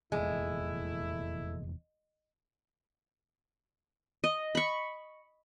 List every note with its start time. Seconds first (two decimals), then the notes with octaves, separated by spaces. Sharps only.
0.12 F1 E2 A#2 G#3 A3 E4
4.24 D#5
4.55 B5 C#6